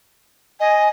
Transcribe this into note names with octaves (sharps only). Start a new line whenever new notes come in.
D#5 G#5